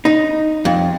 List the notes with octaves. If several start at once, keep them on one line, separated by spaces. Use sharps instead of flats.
D#4
F2